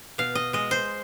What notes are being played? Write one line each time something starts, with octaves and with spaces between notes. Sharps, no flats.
B2 F5
D#5
G#3 D#5
C5